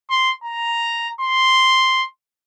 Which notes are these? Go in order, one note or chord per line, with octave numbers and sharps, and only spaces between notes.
C6
A#5
C6